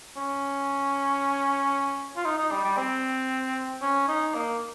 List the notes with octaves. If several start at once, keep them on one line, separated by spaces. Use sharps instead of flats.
C#4
F4
D#4
D#4
G3
G3
C4
C#4
D#4
A#3